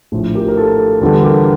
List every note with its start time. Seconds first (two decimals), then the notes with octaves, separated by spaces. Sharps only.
0.12 A#1 A2 F3
0.35 G4 A#4
0.48 A#4
0.57 F4 A4
1.01 E2 D3 G3 F4 A4
1.23 G4 A#4